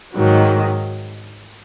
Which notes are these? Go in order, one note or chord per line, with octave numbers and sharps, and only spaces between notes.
G#2 D#3 F#3